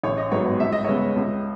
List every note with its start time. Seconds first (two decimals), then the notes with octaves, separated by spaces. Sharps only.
0.03 A1 C#5
0.17 D#5
0.32 G#2 F#3 B3 C#5
0.46 C#5
0.60 C#2 E5
0.72 D#5
0.84 C#3 G#3 B3 C#5
0.97 D#5
1.16 C#2